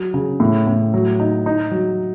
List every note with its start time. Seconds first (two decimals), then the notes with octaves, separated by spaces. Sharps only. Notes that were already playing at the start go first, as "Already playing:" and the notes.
Already playing: F#3
0.14 C#3
0.40 A2
0.67 A2
0.94 F#3
1.20 D#4
1.46 D#4
1.71 F#3